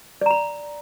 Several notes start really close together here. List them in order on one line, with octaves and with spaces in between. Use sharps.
D5 A#5 B5